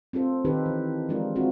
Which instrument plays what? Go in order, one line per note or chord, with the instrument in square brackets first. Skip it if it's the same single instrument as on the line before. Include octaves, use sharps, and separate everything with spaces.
[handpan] C4 F4 A4 C5
D#3 D#4 G4 A4 B4
E3
F3 G#3 D4 F4 A#4
C4 D4 F4 F#4